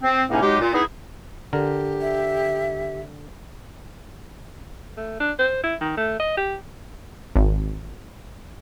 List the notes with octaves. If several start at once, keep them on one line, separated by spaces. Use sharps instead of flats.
C4
C#2 A2 C3 A#3 C#4 D#4
F#3 G#3 D#4 G4
A#2
B3 D#4 E4 G#4
D3 G4 A#4
E5
A3
D4
C5
E4
D#3
A3
D#5
G4
G#1